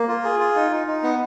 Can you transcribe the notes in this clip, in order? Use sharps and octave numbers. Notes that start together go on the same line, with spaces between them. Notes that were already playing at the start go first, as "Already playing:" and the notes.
Already playing: A#3
F4
G#4
F4
D#4
D#4
D#4
B3